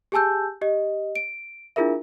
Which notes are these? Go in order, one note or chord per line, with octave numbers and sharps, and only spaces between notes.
G4 G#4 G#5 A5 E6 G6
G4 D#5
D7
D4 E4 F4 G#4 A#4 E5